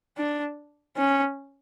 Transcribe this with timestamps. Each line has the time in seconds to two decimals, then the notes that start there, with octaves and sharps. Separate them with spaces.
0.18 D4
0.97 C#4